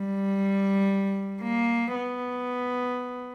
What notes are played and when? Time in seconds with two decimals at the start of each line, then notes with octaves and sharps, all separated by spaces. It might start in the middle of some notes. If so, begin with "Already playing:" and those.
Already playing: G3
1.42 A#3
1.95 B3